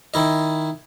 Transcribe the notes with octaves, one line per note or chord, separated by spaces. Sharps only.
D#3 E4 D#5